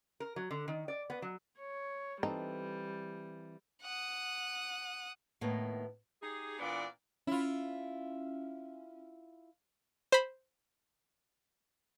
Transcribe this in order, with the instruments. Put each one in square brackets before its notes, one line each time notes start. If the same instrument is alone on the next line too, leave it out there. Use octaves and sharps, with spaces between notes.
[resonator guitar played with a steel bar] A#4
F#3
D3
D#3
D5
B3
F#3
[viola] C#5
[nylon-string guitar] E3 C4 A4 [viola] G3 [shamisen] D#4
[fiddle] F#5 D#6
[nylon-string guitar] A2 D#3 A#3 B3
[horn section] D#4 G4 G#4
A#2 E3 B3 D4 D5
[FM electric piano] C#4 [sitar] E4 F4
[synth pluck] C5 B5